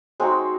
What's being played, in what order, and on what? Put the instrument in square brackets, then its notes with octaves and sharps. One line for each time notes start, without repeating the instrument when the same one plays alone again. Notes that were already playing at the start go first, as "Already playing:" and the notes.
[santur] G#3 C4 D#4 F#4